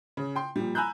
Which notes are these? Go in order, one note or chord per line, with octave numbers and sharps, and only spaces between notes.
C#3
G5 C6
A#2 F3 G3
G#5 A#5 B5 E6 F#6 G6